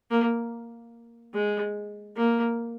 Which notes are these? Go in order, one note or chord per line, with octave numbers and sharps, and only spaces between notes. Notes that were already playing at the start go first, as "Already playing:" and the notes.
A#3
G#3
A#3